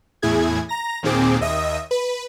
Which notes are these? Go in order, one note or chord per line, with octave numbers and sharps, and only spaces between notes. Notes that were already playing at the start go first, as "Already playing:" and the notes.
E2 A2 E4 G#4 G#6
A#5 A#6
D#2 A#2 D#3 C4 G#4 D6
D#2 D#5 E5 D#6
B4